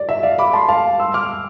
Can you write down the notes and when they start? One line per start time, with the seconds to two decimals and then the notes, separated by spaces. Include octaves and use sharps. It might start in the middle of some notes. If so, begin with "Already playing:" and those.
Already playing: D5
0.09 E5
0.23 D5 F5
0.38 B5 D6
0.53 A5 C6
0.68 F5 A5
1.00 C6 E6
1.14 D6 F6